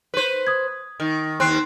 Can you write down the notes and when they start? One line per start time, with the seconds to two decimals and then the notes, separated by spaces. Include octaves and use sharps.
0.14 B4 C5
0.47 D#6 G#6
1.00 D#3
1.40 D#2 C4 C6 F#6 C7